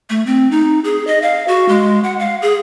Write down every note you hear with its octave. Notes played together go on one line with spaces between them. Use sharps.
A3
C4
D#4
G#4
D#5
F5
F#4
G#3
F#5
F5
G#4